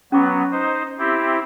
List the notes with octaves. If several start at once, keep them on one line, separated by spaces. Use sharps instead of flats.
F#3 B3 C#4 D6
D#4 C5
C4 E4 G4